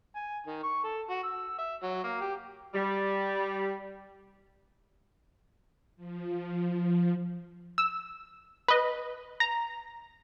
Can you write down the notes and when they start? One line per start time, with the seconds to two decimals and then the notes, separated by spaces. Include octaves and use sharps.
0.16 G#5
0.47 D#3
0.63 C#6
0.84 A4
1.10 F#4
1.23 E6
1.58 E5
1.82 F#3
2.04 A#3
2.21 G4
2.74 G3
5.96 F3
7.78 E6
8.68 B4 D#5
9.40 A#5